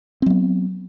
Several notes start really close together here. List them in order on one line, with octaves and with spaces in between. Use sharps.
C4 F#3 B3